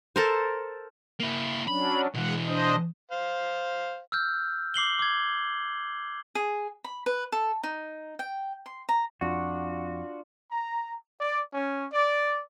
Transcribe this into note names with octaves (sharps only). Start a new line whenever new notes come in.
A4 A#4 C5
A#3 E4
F#3 C#4 D4 B5
B2 E3 G#3 F#5
D4 C5 D#5
C5 F5
E6 F6 G6
D6 C7 F#7 G7
D6 G#6
G#4
B5
B4
A4
D#4
G5
C6
A#5
F2 D4 F4 F#4
A#5
D5
C#4
D5